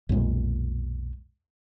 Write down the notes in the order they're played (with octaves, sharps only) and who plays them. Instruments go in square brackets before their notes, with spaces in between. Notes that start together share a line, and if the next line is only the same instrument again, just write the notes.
[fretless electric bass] B1 F2 A#2 G#3